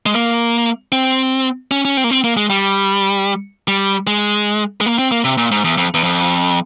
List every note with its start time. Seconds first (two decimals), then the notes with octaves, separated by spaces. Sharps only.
0.06 G#3
0.14 A#3
0.92 C4
1.71 C#4
1.85 C#4
1.97 C4
2.04 A#3
2.11 C4
2.24 A#3
2.37 G#3
2.50 G3
3.68 G3
4.07 G#3
4.81 G#3
4.86 A#3
4.99 C4
5.12 A#3
5.24 C3
5.38 A#2
5.51 G#2
5.64 E2
5.78 F2
5.94 E2
6.03 F2